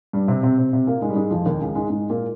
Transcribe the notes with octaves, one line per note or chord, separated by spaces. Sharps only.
G2 G3
C3 C4
C3 C4
C3 C4
C3 C4
A#2 A#3
G#2 G#3
G3
G#2 G#3
F2 F3
D#2 D#3
C#2 C#3
G#2 G#3
G#2 G#3
A#2 A#3